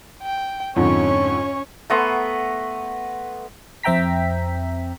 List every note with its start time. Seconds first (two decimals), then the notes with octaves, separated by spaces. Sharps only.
0.23 G5
0.76 F2 G#2 D3 C#4 C#5
1.90 A3 B3 A#5 C6
3.83 F2 C4 E5 G5 A#5 B6